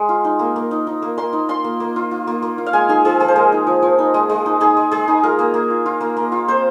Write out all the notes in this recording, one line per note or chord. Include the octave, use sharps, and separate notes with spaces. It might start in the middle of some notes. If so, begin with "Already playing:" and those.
Already playing: G#3
F4
D#4
A#3
A#3
D#4
D#4
A#3
A#3 C6
D#4
F4 C6
A#3
A#3
F4
F4
A#3
A#3
F4
F5
G#3 G#5
D#4 G#4
F3 G#4
F3 G#4
C5
G#3 A#4
D#4
F3
F3
D#4
G#3
G#3
D#4
D#4 G#4
G#3
G#3 G#4
D#4
F4 A#4
A#3
A#3
F4
F4
A#3
A#3
F4
C4 C5